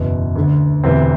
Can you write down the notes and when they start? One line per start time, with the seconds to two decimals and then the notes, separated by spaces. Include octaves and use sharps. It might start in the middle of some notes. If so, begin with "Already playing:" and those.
Already playing: F#1 E2 B2
0.36 D2 D3
0.84 E1 D2 C3 E3 C4